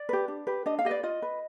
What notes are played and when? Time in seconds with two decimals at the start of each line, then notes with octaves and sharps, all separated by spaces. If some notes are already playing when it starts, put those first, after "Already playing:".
Already playing: D5
0.09 G4 B4
0.28 D4
0.47 G4 B4
0.66 D4 D#5
0.79 F5
0.85 G4 D#5
0.89 B4 D5
1.03 F4 D#5
1.22 B4